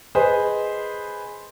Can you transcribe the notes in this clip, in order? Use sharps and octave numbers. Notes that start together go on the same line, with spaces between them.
G#4 B4 C5 D#5